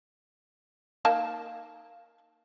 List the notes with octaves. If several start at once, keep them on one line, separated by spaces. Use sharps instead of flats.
A#3 D#4 A5